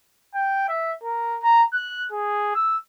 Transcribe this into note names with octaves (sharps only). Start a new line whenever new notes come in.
G5
E5
A#4
A#5
F#6
G#4
E6